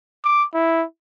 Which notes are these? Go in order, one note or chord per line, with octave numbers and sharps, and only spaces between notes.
D6
E4